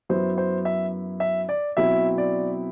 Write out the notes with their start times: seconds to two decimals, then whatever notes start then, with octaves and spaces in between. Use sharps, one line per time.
0.09 F#2 F#3 B3 E4 C5
0.38 C5
0.65 E5
1.20 E5
1.49 D5
1.77 B2 F#3 C4 E4 E5
2.18 D5